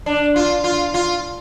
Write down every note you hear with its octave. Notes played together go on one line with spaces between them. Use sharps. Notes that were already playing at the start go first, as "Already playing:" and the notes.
D4
F4
F4
F4